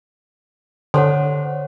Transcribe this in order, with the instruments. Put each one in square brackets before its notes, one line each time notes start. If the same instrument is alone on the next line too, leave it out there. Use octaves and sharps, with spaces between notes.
[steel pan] D3 [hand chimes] C5 C#5 F#5